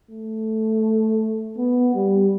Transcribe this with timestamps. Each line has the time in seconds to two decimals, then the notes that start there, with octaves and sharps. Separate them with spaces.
0.11 A3
1.57 B3
1.94 G3